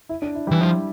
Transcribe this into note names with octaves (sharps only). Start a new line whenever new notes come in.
E4
D4
E4
G3 G4
E3
F3 E4